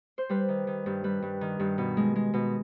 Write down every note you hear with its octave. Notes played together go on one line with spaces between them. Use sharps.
C5
G3 B4
D#3
D#3
G2
G3 B4
G2
D#3
G2
B2
G#3
G#3
B2